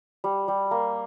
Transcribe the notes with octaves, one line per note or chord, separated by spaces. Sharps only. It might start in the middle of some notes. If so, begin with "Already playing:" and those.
G3
G3
A#3